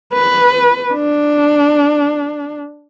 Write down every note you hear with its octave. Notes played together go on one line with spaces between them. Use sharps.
B4
D4